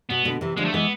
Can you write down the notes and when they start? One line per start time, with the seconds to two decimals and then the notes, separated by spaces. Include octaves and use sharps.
0.10 B2 B3
0.25 B2 D3
0.41 C3 E3
0.57 D3 F3 G#3
0.65 A3
0.73 E3 G#3 B3